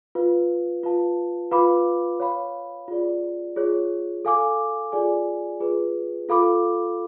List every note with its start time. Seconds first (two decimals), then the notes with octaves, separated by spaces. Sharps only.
0.15 F4 B4 F5
0.83 F4 B4 F5 A5
1.51 F4 B4 F5 B5 D6
2.20 C#5 F5 B5
2.88 F4 G#4 D5
3.56 F4 G#4 C#5
4.25 A4 F5 G#5 D6
4.92 F4 G#4 D5 G#5
5.60 F4 G#4 B4
6.29 F4 A4 F5 B5 D6